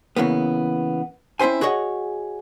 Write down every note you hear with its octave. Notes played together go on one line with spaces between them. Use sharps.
C#3 E3 A#3 B3
C4 C#4 E4 C5 G#5
F#4 G#4 C#5 D#5 F#5